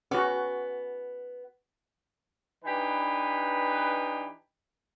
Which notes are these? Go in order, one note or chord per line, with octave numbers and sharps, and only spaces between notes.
B3 C#4 F#4
E3 D4 D#4 G4 B4